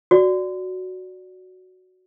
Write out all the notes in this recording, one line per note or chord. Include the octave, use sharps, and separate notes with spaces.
F#4 D5